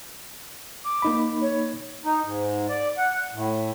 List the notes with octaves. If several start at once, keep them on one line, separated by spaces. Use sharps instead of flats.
D6
A#3 D#4 B5
C#5
D#4
G#2
D5
F#5
A2